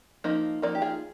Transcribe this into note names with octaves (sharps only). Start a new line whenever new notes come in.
F3 A#3 D#4
F3 A#3 D#4 A#4 D5
G4
F4 G#4